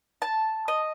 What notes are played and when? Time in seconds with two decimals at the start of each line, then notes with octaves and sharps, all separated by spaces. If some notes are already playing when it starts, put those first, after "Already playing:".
0.22 A5
0.68 D#5